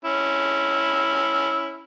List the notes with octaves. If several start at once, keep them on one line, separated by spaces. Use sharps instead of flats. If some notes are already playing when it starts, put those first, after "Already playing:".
C#4 E4